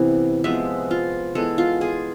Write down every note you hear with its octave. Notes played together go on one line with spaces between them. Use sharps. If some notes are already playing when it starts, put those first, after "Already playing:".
Already playing: C3 E3 B3
C3 F3 G#3 B3 E5
F4
E3 G#3 B3 A4
F4
G#4